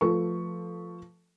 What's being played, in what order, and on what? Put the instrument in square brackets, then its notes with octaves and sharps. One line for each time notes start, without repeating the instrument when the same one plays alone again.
[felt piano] F3 A3 A4 B4 C#6